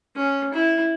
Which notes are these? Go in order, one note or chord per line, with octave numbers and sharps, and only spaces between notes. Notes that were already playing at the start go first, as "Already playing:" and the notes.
C#4
E4